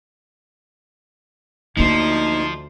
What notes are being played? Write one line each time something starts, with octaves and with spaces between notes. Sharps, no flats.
D2 F3 A#3 D4 D#4 C5